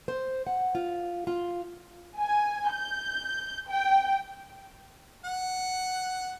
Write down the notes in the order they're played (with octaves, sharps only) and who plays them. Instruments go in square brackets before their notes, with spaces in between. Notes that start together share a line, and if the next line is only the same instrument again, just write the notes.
[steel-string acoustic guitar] C5
F#5
F4
F4
[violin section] G#5
G6
G5
[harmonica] F#5